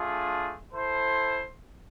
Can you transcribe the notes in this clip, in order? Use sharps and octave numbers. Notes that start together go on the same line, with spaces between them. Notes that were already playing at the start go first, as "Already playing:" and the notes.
Already playing: A3 D4 F4 G#4
E4 A4 C5